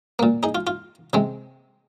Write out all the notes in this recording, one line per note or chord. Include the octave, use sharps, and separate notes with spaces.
A#2 A#3
D#4 G#4
F4
F4
C3 G#3 C4